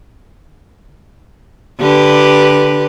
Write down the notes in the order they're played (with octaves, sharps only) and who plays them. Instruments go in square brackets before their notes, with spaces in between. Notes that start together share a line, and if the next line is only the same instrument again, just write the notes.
[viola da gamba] D3 G4 B4